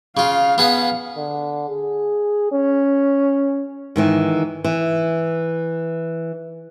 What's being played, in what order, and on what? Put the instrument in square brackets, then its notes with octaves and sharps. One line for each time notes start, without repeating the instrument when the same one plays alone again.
[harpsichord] C#3 F4 [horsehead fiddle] F5
[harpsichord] B3 G#4 B4
[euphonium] D3
G#4
C#4
[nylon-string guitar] G#2 D#3 E3
E3